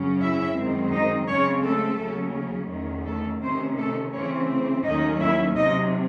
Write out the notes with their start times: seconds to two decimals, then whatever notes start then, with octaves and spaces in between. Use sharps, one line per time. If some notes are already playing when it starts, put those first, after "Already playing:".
Already playing: F#2 C#3 F#3 C#4
0.21 E4 E5
0.56 F#2 D#3 G#3 C4
0.92 D#4 D#5
1.27 C#3 G#3 C4 C#4 C#5
1.63 A3 A4
1.99 D#2 C#3 F#3 C#4
2.70 E2 D#3 A3 C#4
3.06 A3 A4
3.42 C3 D#3 A3 C4 C#4 C5
3.77 A3 A4
4.12 C#3 E3 A3 C4 C#4 C#5
4.84 D#2 D#3 F#3 A3 C#4 D#4 D#5
5.20 E4 E5
5.55 C3 F#3 C#4 D#4 D#5